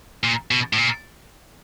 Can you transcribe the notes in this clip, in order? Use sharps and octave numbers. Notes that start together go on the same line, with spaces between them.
A#2
B2
A2
A#2